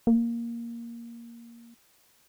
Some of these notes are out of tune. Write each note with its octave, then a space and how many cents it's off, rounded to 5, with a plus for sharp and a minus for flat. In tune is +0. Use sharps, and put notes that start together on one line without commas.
A#3 +5